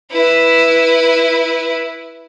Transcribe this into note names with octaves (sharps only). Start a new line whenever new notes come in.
E4 B4